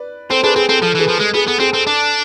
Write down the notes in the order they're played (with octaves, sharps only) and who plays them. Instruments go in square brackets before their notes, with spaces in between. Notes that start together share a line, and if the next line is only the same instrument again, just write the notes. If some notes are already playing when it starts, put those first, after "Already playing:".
Already playing: [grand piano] B4 D5
[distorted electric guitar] C4 [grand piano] A4 C5
[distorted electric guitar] D4 [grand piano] G#4 B4
[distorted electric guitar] C4 [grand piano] G#4
[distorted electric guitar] C4 [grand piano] A4
[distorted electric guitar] F3 [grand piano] A4
[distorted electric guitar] E3 [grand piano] G#4 B4
[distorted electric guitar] F3
[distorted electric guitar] G#3 [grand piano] A4
[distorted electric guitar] B3 [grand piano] G#4
[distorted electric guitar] B3 [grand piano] A4
[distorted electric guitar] C4 [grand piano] G#4
[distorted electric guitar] C4 [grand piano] A4
[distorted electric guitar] D4 [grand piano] A4